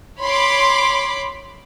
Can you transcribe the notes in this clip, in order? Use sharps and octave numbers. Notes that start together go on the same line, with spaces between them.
C#5 B5 C6 D6